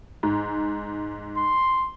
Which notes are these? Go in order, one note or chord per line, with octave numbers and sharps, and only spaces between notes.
G#2
C6